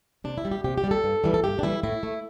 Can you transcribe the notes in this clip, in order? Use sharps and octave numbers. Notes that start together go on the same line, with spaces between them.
C3 D4
E4
G3
G4
C3 G4
G4
G3
A4
G2
E3 G3
A4
G2 G4
D4
E3 G3 E4
A2 E4
A3